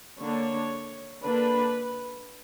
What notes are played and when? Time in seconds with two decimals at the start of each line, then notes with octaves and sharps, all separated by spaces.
0.20 D3 A#3 D4 C#5
1.24 D3 A#3 D4 B4